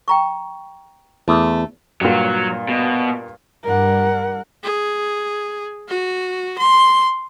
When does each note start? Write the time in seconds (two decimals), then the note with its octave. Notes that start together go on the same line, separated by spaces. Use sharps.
0.08 G5 A#5 C#6
1.28 E2 A3
2.01 G2 A#2 F#3
2.68 B2
3.63 G2 G3 A#4 F#5
4.63 G#4
5.88 F#4
6.58 C6